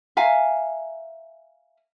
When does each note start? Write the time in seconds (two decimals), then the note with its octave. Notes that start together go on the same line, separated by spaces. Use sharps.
0.17 E5 F5 G#5 A#5